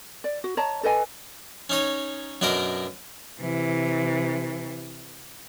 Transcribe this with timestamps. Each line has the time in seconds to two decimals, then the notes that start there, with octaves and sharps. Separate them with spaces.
0.24 D5
0.44 F#4
0.57 C#5 D#5 A5 A#5
0.83 A4 B4 D#5 G#5
1.70 C#4 D#4 C#5
2.41 F#2 B2 D4 A#4 D#5
3.41 C3 E3